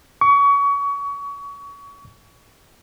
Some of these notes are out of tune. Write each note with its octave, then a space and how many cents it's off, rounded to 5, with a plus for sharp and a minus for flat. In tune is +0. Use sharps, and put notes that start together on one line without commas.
C#6 +30